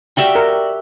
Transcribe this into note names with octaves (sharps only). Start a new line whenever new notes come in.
F#4 G4 D5 E5 G5
A#4